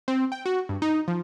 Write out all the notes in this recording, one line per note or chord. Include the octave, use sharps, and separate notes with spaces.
C4
G5
F#4
G2
D#4
F3